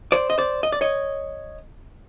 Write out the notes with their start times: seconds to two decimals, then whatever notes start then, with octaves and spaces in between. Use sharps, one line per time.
0.12 C5 D5
0.30 D#5
0.38 C5 D5
0.63 D#5
0.72 D5
0.81 C#5 D#5